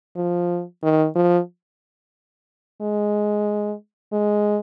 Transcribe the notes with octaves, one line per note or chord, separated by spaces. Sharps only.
F3
D#3
F3
G#3
G#3